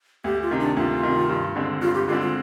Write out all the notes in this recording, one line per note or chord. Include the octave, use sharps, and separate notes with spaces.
D2 G4
F4
C3 D#3
D4
D2 F4
C3 D#3
G2
D3 G#3 C4
G2 F4
G4
D3 G#3 C4 F4
F4